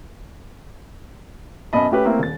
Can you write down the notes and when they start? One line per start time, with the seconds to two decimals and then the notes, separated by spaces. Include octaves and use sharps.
1.73 F#2 B2 D#5 A5 B5
1.91 A3 C#4 G4 B4
2.05 A3 A#3 C4 E4
2.19 D#1 A6